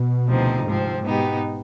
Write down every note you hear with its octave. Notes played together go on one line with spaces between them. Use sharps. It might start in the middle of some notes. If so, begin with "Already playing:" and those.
Already playing: B2
D2 C3 F3 C4 D#4
G#2 C3 F3 C4
B2 B3 D#4 G4